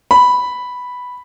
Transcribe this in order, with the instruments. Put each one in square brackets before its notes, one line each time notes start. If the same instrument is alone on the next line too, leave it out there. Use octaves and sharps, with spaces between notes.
[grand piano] B5